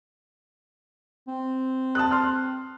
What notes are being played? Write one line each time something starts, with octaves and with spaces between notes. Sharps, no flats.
C4
A5 D#6 F#6
C6 F6